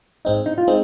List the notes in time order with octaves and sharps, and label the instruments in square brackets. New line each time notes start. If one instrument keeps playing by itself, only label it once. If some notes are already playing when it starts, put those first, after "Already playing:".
[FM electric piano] G#2 G#3 C4 D#4
[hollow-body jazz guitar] D#4
F4
[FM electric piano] G#3 C4 D#4